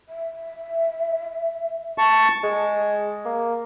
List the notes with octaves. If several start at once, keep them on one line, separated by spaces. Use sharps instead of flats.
E5
A5 C#6
G#3
A#3